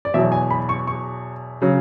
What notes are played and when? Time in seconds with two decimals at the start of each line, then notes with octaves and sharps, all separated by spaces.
0.05 D5
0.14 E2 B2 F#3 E5
0.32 G#5
0.51 B5
0.69 C#6
0.87 C#6
1.62 C#3 F#3